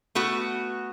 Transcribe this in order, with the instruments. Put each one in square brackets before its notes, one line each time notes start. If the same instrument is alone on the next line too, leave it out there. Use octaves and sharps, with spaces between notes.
[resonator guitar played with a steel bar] A3 B3 F#4